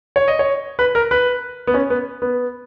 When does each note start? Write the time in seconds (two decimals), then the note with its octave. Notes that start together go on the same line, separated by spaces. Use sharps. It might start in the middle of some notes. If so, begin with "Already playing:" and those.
0.16 C#5
0.28 D#5
0.39 C#5
0.79 B4
0.95 A#4
1.11 B4
1.67 B3
1.74 C#4
1.90 B3
2.22 B3